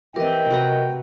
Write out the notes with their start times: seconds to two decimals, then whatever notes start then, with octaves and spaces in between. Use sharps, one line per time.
0.16 E3 C4 G4 A#4 D#5 G5
0.50 C3 F#4 B4 A#5